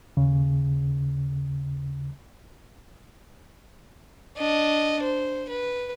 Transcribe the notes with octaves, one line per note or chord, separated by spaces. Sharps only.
D#2 C#3
D4 D#5
C5
B4